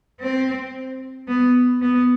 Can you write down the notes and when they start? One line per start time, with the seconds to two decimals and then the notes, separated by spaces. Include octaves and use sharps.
0.20 C4
1.28 B3
1.81 B3